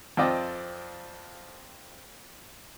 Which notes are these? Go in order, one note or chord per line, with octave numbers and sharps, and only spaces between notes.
F2 C4 F4 D5 D#5 G5